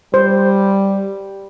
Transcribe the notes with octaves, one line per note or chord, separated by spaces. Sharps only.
G3 C5